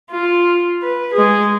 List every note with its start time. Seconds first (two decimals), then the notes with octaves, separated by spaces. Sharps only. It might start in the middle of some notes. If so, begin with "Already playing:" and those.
0.11 F4
0.83 B4
1.14 G#3 G#4